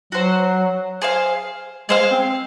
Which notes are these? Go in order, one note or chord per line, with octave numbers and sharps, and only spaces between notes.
F#3 F#4 C5 F#5
G#4 C5 F5
G#3 G#4 C5 F5
C4